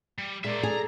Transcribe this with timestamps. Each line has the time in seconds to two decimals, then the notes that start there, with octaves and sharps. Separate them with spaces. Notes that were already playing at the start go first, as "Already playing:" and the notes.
0.18 G3
0.44 A#2 G#3 A#3 A#4 D5 E5
0.63 G#4 A4 A#5